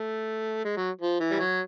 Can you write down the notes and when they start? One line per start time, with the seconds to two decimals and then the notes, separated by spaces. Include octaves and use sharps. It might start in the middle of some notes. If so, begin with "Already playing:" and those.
Already playing: A3
0.65 G#3
0.77 F#3
1.01 F3
1.20 E3
1.31 G3
1.40 F#3